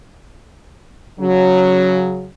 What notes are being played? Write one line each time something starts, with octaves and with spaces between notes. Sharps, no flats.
C#3 F#3